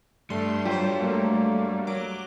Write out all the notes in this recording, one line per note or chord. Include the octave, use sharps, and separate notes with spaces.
G3 A3 D4 C6
F#3 F4 C5 G5
A3 A#3
F#3 D6